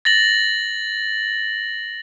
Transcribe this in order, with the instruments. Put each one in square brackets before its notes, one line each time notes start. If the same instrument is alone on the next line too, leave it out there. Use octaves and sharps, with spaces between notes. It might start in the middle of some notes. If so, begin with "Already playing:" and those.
[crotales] A6 A#6 F#7